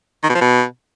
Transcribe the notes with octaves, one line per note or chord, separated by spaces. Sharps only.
D#3
B2
F3
B2